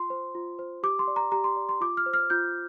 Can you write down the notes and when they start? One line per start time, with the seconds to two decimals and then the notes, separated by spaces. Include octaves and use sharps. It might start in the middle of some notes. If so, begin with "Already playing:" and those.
Already playing: F4 C6
0.10 C5
0.35 F4
0.59 C5
0.83 G4 D6
0.99 C6
1.07 D5
1.16 A#5
1.32 G4 A#5
1.44 C6
1.56 D5
1.69 C6
1.81 F4 D6
1.97 F6
2.06 C5
2.14 F6
2.30 F4 G6